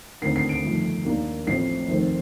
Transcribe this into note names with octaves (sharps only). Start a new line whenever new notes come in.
D#2 D3 A3 C4 C7
C7
D7
G1 F2 D#3 A3
D#2 D#3 A#3 D4
A1 A2 F3 A3 C4 C7
F1 D#2 D#3 A3 C4